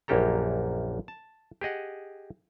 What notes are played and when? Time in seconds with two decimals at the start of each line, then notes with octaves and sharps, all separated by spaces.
0.08 A#1 F#2 A#3 G4 A4 A#5
1.08 A5
1.61 G4 G#4 D#5 F#5